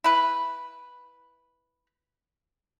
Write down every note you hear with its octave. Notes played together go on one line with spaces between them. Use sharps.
E4 B4